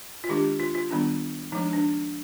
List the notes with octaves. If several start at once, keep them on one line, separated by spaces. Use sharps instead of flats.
F4
D#3 G#3 D4 G4
F4
F4
D#3 G3 B3 D4
F3 G#3 D4 D#4
D4